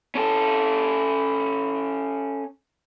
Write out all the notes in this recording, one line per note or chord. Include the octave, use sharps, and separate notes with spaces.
C#4 A4